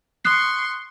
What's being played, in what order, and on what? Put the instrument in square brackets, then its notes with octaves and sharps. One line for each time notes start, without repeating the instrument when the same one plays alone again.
[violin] C6 C#6 [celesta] D#6 F#6 C7